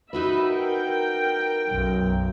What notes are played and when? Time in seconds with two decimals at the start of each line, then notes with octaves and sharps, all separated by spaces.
0.13 D#4 F#4 B4 E5 B5
0.48 A#4 G5
1.69 B1 F#2